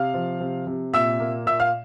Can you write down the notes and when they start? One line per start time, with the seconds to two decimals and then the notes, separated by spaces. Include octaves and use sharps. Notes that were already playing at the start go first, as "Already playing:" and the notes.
Already playing: C3 F5 F6
0.14 F3
0.41 C3
0.67 C3
0.93 A#2 E5 E6
1.20 A#3
1.46 A#2 E5 E6
1.60 F5 F6